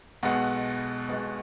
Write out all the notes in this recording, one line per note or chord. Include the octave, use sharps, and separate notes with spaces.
B1 B2 G#3 B3 F#5
B1 B2 G#3 B3